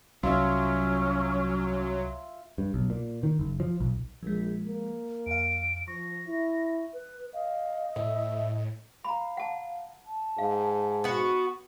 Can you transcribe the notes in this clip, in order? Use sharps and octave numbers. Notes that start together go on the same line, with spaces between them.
C2 F#3 C#4 F4 E5
G2
B1
A#2
D#3
F#1
F3
B1
A#1 F3 G#3
A#3
F2 F5 D7
F3 C#6 A#6
E4
B4
D#5 F5
A2 E5
F5 A#5 B5
F#5 A5
A5
G#2 F5
B3 F#4